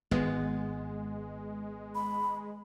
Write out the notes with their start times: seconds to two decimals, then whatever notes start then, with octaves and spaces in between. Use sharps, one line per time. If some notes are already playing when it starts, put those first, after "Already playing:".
0.11 G#1 G#3 B3
1.95 B5